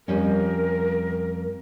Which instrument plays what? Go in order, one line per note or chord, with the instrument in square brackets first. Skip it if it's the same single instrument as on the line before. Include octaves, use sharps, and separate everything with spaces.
[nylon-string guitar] F2 G3 C#4 [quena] A#4